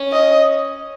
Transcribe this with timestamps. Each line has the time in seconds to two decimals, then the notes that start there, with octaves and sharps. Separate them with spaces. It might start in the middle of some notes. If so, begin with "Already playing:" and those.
Already playing: C#4
0.13 D#5